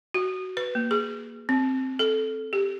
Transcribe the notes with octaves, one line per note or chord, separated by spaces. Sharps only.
F#4
B4
A#3
G#4
C4
A4
G4